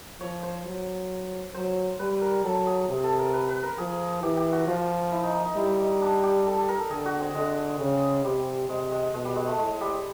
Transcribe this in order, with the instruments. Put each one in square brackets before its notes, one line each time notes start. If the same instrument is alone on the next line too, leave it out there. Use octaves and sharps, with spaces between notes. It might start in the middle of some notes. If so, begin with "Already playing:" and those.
[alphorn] F3 [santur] C#5
[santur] C5
[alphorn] F#3
[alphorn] F#3 [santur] C5
[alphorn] G3 [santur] B4
[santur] A#4
[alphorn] F#3 [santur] A4
[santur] G#4
[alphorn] C3 [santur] G#4
[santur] A4
A#4
B4
B4
A#4
[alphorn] F3 [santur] G#4
[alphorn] E3 [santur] G4
[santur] G4
F#4
[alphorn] F3 [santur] F4
[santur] E4
D#4
D#4
D#4
[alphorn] G3 [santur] E4
[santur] D#4
D4
G4
A4
A4
A#4
A4
[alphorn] D3 [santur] G#4
[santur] F#4
C4
[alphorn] D3 [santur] G#3
[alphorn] C#3
[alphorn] C3 [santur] G3
[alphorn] C3 [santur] G#3
[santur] G#3
[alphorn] B2 [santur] G#3
[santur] G3
G#3
A3
[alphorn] A2 [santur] G#3
[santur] G3